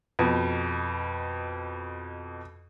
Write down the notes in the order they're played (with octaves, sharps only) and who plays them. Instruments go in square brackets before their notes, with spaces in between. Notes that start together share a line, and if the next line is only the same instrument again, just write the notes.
[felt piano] F2 B2